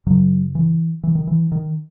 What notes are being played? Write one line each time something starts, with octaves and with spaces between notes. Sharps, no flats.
F#2 C#3 F#3
E3
E3
D#3
E3
D#3